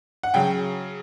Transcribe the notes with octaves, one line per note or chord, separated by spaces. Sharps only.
F#5
C#3 F#3 G5